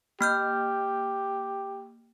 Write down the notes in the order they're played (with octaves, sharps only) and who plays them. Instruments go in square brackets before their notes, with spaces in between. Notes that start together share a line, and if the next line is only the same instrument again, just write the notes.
[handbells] A#3 F6 G6 [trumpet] G4